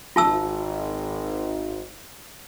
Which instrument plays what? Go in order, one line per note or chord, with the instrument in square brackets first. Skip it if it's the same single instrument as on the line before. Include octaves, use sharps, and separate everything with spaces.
[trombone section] G#1 [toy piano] F4 A5 E6